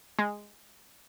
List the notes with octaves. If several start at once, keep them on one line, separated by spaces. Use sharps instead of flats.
G#3